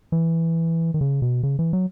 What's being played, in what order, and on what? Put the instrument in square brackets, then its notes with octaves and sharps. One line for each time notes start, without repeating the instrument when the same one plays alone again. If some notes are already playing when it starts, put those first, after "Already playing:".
[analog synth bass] E3
D#3
C#3
B2
C#3
E3
F#3